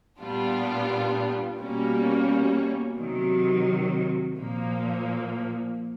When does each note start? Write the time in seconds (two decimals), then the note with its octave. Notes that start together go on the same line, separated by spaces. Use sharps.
0.19 A#2 G3 B3 D4 F4
1.58 B2 G3 A#3 C#4
2.98 C3 D#3 F#3
4.38 A#2 F3 A#3